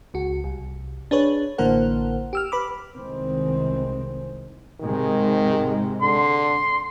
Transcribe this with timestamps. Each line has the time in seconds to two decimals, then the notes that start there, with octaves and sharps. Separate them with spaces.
0.14 C#2 F#4
0.44 C2
1.11 D4 G#4 B4 C#5
1.58 A1 D3 A#3 A#4 C5 F#5
2.33 G4 E6 F6
2.52 B4 B5 D6
2.95 C2 D#3 G#3 C4
4.80 G#2 C3 D#3 G#3
6.01 D3 C6